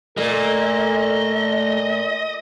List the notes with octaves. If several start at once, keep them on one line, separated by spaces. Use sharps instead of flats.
A#2 A3 A#3 A4 D#5